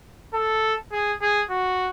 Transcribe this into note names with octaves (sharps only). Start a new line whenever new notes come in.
A4
G#4
G#4
F#4